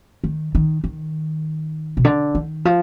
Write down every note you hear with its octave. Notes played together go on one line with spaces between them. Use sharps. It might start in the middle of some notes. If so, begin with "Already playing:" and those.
D#3
D#3
D#3
B2
D3
D#3
F3